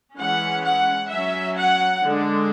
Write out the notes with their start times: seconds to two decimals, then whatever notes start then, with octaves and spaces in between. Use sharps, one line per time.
0.17 E3 G#3 C#4 F#5
0.64 F#5
1.10 F#3 C#4 E5
1.57 F#5
2.03 D3 G#3 D4